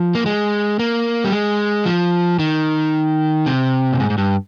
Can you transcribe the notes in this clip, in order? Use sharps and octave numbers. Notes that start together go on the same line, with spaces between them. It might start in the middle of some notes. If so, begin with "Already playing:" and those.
Already playing: F3
A#3
G#3
A#3
G3
G#3
F3
D#3
C3
A#2
G#2
G#2
G2